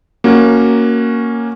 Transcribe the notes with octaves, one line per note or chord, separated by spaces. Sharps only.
A#3 C#4 F#4